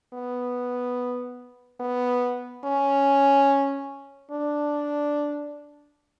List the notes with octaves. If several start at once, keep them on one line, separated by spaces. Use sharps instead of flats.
B3
B3
C#4
D4